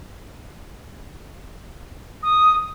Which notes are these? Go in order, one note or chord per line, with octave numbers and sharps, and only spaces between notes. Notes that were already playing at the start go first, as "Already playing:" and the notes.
D#6